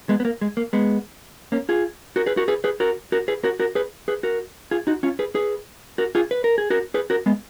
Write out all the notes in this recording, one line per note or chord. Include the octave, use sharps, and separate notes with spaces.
G#3 B3
B3
A#3
G#3
A#3
G#3 B3
A#3 C#4
F4 G#4
F#4 A#4
G#4 B4
F#4 A#4
G#4 B4
G#4 B4
F#4 A#4
F#4 A#4
G#4 B4
F#4 A#4
F#4 A#4
G#4 B4
G#4 B4
F#4 A#4
F4 G#4
D#4 F#4
C#4 F4
G#4 B4
G#4 B4
F#4 A#4
F4 G#4
B4
A#4
G#4
F#4 A#4
G#4 B4
F#4 A#4
G#3 B3